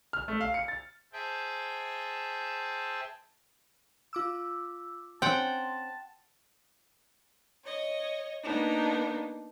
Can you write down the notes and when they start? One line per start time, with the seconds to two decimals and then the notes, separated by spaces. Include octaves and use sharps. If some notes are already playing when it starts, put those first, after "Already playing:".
0.13 F6
0.28 A3
0.41 F5
0.54 C#7
0.68 A6
1.13 G#4 C5 E5 G5 A5
4.13 F4 D6 E6
5.22 C4 C#4 F#5 G5 A5 C6
7.63 C#5 D#5
8.43 A#3 B3 D4 D#4